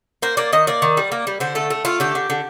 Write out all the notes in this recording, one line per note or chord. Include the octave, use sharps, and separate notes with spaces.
A#3 C5
A#3 D5
D#3 D#5
A#3 D5
D#3
G3
A#3
G3
D3 C5
A3 A4
A3
A3 F4
D3 G4
D3
D3